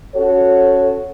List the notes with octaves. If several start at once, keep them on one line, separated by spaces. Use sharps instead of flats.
C#4 F#4 A4 C#5